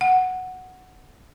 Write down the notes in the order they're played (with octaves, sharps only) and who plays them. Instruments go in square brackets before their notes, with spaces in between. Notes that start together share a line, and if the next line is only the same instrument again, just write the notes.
[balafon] F#5